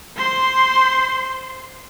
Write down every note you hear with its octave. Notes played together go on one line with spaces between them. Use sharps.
C5 C6